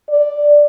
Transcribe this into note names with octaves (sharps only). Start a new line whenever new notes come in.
D5